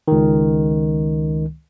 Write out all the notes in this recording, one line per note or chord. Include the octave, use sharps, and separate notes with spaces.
C#2 D#3